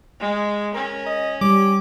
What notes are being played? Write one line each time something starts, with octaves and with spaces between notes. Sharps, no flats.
G#3
C#4 A#4
D#5
G3 D6